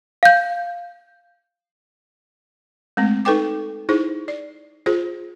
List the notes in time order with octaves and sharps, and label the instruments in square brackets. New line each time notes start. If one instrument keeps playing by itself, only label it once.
[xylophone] F5 G6
[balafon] G#3 A3 C4
D#4 A4 B4 G5 D6
D#4 E4 G#4 C5
D5
F4 G#4 C5